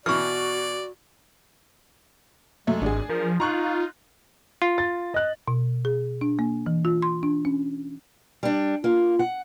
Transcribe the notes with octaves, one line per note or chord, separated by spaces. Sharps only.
B2 E3 F#4 D5 C#6 F6
F#2 G#3 A3
G#1 D4 G#4
F3 A#4
D#4 F4 A#5 C#6 F#6
F4
A6
D#5 F#6
B2
G#4
D4
A#3
E3
F4
C6
D4
C#4
G3 D4
A#3 F4
F#5